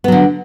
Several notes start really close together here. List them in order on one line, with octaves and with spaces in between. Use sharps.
B3 F#3 D3